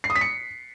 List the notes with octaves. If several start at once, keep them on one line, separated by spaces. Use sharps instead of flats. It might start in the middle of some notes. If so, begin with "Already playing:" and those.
C7
D#6
B6
C#7